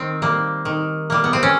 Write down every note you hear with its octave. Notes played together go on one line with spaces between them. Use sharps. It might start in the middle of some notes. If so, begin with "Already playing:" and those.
Already playing: D#3 C4
G3 A#3
D#3
G3 A#3
B3
C4
C#4